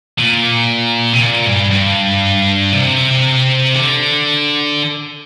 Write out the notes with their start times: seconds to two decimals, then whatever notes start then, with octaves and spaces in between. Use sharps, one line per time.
0.19 A#2
1.13 C3
1.20 A#2
1.46 G2
1.70 G2
2.72 C3
3.74 D3